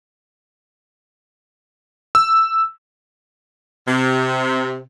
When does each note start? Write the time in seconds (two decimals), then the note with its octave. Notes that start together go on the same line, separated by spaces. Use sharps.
2.15 E6
3.88 C3